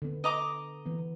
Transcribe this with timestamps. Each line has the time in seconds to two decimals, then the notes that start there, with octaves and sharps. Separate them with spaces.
0.02 D3 B3
0.24 D#5 A#5 D6
0.85 E3 B3